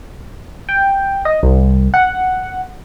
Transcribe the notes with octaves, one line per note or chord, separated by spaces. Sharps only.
G5
D#5
C2
F#5